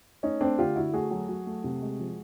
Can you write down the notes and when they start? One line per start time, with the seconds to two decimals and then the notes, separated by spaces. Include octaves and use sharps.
0.23 A3 C#4 D#4
0.41 A3 C4 D4
0.58 D3 F4 G4
0.76 D3 E4 F#4
0.93 A3 F#4 G#4
1.11 F#3
1.29 F#3
1.47 A3
1.64 C3
1.82 G#3
2.00 F3